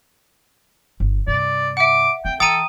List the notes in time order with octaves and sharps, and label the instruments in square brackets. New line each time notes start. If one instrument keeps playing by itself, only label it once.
[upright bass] G1
[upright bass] G2 C3 [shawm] D5
[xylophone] E5 F#5 [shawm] D6
[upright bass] C4 [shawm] G5
[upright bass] E3 [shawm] A4 [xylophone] G5 A#5 [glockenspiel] D#6 D#7